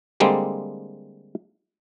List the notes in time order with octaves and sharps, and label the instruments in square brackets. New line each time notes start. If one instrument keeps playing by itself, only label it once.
[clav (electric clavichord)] D3 G3 G#3 A#3 C4